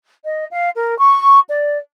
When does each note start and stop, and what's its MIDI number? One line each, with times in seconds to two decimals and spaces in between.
0.24 0.45 75
0.52 0.69 77
0.76 0.97 70
0.98 1.39 85
1.49 1.78 74